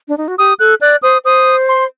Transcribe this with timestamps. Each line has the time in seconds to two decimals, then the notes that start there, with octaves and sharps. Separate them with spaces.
0.08 D4
0.18 D#4
0.28 F#4
0.38 G4 D#6
0.59 A4 F#6
0.81 D5 F#6
1.02 C5 D#6
1.24 C5 D#6
1.69 C6